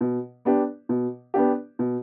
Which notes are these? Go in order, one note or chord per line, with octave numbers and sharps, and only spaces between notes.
B2
B3 D4 G4
B2
B3 D4 G4
B2